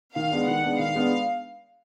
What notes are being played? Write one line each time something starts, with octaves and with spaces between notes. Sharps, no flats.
D#3 F5
G#3 B3 D4
D#3 F#5
G#3 B3 D4
D#3 F5
G#3 B3 D4